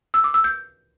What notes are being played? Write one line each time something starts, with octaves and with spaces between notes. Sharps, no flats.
E6
D6
E6
G6